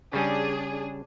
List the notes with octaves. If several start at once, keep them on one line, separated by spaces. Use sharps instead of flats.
C#3 G3 C#4 D4 G#4